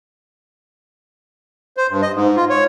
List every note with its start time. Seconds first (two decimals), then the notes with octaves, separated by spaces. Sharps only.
1.77 C5
1.90 G2
2.02 D#5
2.15 G#2
2.36 F4
2.50 C#5